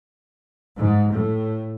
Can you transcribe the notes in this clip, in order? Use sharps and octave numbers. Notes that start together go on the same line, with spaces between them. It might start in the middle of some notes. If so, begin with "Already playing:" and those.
G#2
A2